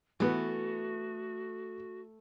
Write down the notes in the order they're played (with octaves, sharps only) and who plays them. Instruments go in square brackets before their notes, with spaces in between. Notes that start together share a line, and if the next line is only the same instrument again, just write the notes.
[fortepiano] E3 B3 [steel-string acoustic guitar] A3 [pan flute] F#4